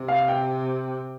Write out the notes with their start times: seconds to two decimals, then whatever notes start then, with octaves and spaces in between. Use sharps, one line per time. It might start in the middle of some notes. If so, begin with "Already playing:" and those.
Already playing: C3
0.08 F5
0.28 G5